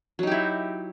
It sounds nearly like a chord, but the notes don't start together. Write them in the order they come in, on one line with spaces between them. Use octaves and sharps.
F#3 D#4 G4 E4